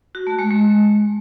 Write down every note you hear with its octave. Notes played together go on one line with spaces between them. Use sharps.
F#4
A3
G#3
G#3